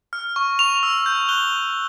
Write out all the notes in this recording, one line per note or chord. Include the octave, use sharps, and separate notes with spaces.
F6
C#6
C#6 F7
E6
G6
F#6 G7